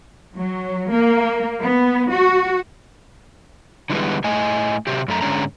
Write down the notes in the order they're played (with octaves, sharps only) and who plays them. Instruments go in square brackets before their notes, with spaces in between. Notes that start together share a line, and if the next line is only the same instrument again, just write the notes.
[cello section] F#3
A#3
B3
F#4
[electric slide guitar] D3 E3 G3 G#3 B3
A2 A3 D#5 G#5
C3 F#3 G4
F#2 A3 A#5
G#2 D3 G3 G#3 C#4 A#5